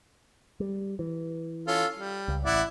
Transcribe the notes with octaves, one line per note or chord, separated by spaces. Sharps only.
G3
E3
C#4 F4 A4
G3
C#2
A1 E4 D5 F#5